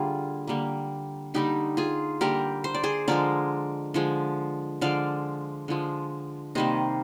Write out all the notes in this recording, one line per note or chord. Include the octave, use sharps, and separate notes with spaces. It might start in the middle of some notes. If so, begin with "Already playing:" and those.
Already playing: D3 G3 A#3 F4 G#4
D3 G3 A#3
D3 G3 A#3 D#4 G4
F4 G#4
D3 G3 A#3 G4 A#4
C5
D5
G#4 C5
D3 F3 G#3 A#4 D5
D3 F3 G#3
D3 F3 G#3 D5 F5
D3 F3 G#3
C3 D#3 G3 A#3 C5 D#5